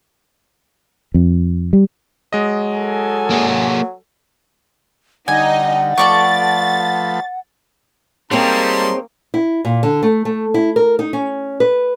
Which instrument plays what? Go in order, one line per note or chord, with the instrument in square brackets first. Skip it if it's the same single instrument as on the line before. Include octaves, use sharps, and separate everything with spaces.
[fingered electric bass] F2
G3
[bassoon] F#3 [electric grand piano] G#3 D#5
[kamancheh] A4 G#5
[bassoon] F#3 [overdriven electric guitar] A#3 G#4
[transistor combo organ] D3 G3 [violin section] D#4 D#5 [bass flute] F#5 [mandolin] G#5
[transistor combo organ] F3 A3 B4 [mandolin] A4 D5 C#6 [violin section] A6
[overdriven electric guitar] G3 [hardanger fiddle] A#3 [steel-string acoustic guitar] C4 G#4 C#5 [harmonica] D#4 A5 C6
[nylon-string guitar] E4
A#2
D3
A3
A3
E4
A#4
D#4
C#4
B4